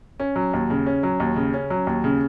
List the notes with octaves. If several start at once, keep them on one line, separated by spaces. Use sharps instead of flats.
C#4
F#3
D#2
C#3
C#4
F#3
D#2
C#3
C#4
F#3
D#2
C#3